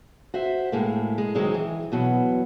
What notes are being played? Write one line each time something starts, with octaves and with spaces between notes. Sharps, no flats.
F#4 C5 E5
A2 G#3 A#3
G#3
D#3 F3 F#3 G#3 C4
E3
E2 B2 F#3